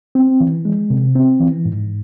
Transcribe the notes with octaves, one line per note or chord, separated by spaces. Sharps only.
C4
E3
G#3
C3
C4
E3
G#2